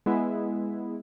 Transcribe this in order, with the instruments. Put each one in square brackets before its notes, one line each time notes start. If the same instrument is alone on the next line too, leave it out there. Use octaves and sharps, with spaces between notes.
[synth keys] G#3 B3 E4